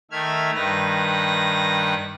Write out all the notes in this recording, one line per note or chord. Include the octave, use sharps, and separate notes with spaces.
D#3 A3 E5 F6 G#6
G2 D#3 B4 A#6